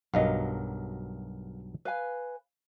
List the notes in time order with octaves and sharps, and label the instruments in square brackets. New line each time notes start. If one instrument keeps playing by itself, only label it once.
[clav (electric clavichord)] B1 G2 F#3 [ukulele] A#4 D#5 F5
[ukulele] B4 F5 G#5